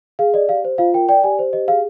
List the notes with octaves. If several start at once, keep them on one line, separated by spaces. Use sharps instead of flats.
G#4 F5
D5 D#5
G4 F5
C5
F4 F5
A#4 G5
D5 G5
G4 G#5
C5
G4 D#5
G#4 F5